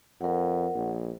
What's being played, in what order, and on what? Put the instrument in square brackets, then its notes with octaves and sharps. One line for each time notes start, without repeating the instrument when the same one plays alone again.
[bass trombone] F2 [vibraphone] A#4 F#5
[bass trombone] A#1